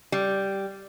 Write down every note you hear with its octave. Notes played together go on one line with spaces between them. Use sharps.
G3